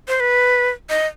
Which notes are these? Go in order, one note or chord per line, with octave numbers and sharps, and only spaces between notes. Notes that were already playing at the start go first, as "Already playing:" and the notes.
C5
B4
D#5